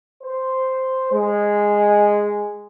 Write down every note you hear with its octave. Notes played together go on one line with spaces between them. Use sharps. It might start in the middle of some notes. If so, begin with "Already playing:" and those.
C5
G#3